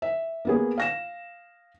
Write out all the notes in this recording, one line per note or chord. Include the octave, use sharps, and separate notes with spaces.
E5
A#3 B3 G#4
F5 A#6 E7